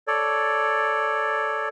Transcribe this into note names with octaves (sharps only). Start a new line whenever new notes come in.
A4 C#5 D5